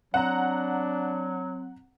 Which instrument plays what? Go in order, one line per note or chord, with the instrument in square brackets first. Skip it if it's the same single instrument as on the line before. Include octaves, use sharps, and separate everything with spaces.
[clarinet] F#3 [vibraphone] C4 [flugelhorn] D4 [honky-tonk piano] F#5 A#5